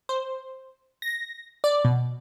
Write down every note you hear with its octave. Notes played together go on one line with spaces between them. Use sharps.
C5
A#6
D5
B2